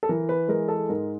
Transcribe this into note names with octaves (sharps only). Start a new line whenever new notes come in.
A4
E3 A#4
B4
G#3 A#4
A4
G#2 A#4